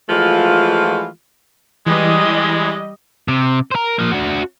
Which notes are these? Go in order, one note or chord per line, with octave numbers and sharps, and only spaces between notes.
E3 F3 G#3 A3 F4 F#4
E3 G3 G#3 D#5
C3
A#4 C5
F3 A#3
D4 F#4